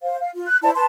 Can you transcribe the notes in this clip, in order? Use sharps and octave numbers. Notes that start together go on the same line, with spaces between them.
C5 F5
F5
F4
F#6
E4 C5 D5 A5
B4 A5 C6